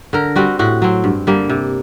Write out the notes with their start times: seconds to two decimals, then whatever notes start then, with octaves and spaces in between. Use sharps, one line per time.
0.13 D3 A#4
0.36 G3 C4 F#4
0.59 A2 F#4
0.82 F#3 C4
1.04 G2
1.27 D3 G3 A#3
1.49 C3